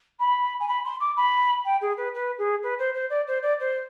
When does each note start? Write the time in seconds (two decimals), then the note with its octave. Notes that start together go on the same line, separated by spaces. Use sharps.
0.19 B5
0.60 G#5
0.68 B5
0.84 C6
1.00 D6
1.16 B5
1.65 G5
1.81 G#4
1.97 B4
2.14 B4
2.38 G#4
2.62 B4
2.78 C5
2.94 C5
3.10 D5
3.27 C5
3.42 D5
3.59 C5